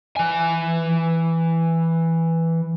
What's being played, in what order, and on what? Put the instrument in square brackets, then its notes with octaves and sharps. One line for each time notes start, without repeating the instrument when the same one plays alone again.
[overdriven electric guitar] E3 G#5